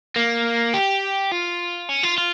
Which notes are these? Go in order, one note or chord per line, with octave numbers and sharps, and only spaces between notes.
A#3
G4
F4
C#4
F4
F4